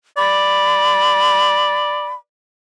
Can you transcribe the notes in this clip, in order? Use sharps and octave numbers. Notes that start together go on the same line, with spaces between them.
D5 B5